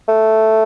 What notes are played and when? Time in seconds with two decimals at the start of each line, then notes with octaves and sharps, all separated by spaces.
0.08 A3